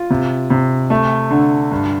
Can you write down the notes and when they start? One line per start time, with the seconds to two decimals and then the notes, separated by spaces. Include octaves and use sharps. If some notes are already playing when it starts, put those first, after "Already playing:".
Already playing: F4
0.10 C3
0.50 C3
0.90 A3
1.30 D3
1.71 G2